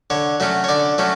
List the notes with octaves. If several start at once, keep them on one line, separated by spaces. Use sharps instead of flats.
D3 C#5
F#3 A3 C#4
C#5
D3 D5
F#3 A3 C#4